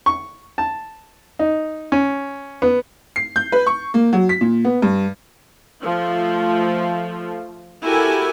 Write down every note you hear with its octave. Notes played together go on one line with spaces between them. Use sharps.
C#6
A5
D#4
C#4
B3
C7
G6
B4
C#6
A#3
F#3
B6
A#2
B3
G2
F3 A3
E4 F#4 G4 A4 A#4 G#5